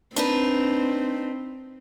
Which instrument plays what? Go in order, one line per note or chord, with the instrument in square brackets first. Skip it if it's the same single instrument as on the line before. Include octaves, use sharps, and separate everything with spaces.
[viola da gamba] C4 [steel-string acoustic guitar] D4 D#4 B4